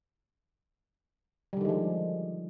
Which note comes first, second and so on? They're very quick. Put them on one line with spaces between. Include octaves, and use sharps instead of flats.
G3 D3 D#3 G#3 F3